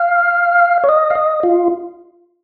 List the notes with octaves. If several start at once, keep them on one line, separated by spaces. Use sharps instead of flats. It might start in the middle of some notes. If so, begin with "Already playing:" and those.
Already playing: F5
C#5
D#5
F5
D#5
F4